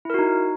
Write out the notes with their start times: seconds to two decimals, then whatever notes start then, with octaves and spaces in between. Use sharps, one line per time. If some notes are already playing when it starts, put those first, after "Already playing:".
0.05 E4
0.10 A#4
0.14 F#4
0.19 D#4